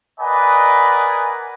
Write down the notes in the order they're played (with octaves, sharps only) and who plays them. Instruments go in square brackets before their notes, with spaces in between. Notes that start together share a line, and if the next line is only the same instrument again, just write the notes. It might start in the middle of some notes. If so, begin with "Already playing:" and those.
[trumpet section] A#4 B4 D5 D#5 F#5 G#5